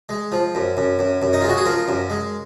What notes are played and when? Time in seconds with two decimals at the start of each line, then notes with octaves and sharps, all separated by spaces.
0.09 G#3
0.32 F3
0.55 F#2
0.77 F#2
0.99 F#2
1.22 F#2
1.33 D#4
1.41 G#3 F4
1.49 F#4
1.57 G#4
1.66 F3 A#4
1.88 F#2
2.10 G#3